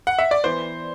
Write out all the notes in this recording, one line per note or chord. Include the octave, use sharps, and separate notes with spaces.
F#5
E5
D5
E3 B3 C5